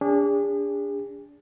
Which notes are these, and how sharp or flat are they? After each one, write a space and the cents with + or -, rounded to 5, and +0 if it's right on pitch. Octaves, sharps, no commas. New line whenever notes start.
D4 -30 G#4 -40